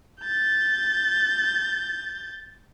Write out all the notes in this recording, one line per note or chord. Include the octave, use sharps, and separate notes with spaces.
G6 A6